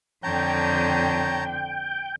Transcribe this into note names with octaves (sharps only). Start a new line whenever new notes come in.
F2 D3 C#5 G5 A5 A#5